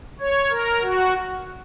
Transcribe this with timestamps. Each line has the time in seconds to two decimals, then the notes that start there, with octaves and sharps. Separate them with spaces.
0.20 C#5
0.51 A#4
0.82 F#4